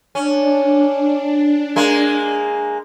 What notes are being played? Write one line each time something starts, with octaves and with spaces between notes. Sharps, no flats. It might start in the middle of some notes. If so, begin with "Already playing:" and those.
C#4 D4
G#3 A#3